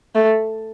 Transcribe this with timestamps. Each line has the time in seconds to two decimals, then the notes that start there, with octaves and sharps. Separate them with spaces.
0.15 A3